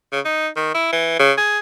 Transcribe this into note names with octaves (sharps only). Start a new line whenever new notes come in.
C#3
D#4
D#3
E4
E3
C#3
G#4